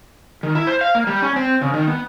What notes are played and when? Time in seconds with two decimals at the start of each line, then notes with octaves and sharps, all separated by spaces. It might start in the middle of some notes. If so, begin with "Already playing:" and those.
0.43 D#3
0.55 E4
0.67 C5
0.81 F5
0.95 A#3
1.07 G3
1.22 C#4
1.36 C4
1.61 C#3
1.74 D#3
1.87 B3